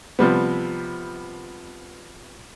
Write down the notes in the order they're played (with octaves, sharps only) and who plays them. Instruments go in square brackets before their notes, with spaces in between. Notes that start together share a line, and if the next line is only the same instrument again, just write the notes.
[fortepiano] C3 F3 G3 B3